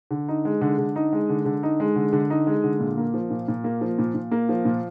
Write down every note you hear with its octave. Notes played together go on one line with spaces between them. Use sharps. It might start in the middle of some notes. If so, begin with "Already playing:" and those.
D3
D#4
G#3
D3
D3
D#4
G#3
D3
D3
D#4
G#3
D3
D3
D#4
G#3
D3
A#2
A#3
F3
A#2
A#2
A#3
F3
A#2
A#2
A#3
F3
A#2